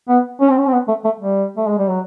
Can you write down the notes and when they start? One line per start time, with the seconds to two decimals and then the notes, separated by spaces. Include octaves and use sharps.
0.09 B3
0.40 C#4
0.50 C4
0.58 C#4
0.67 C4
0.73 B3
0.88 A3
1.05 A3
1.20 G3
1.57 A3
1.67 G#3
1.78 G3
1.90 F#3